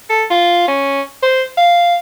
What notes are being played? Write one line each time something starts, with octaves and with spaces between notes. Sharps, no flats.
A4
F4
C#4
C5
F5